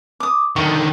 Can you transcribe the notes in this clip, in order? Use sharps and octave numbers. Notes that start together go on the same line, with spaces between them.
D6 D#6
D3 D#3 C#6